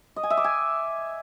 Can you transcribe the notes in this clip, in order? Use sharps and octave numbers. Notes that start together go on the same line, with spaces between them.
D#5
G#5
E5
D6
G#5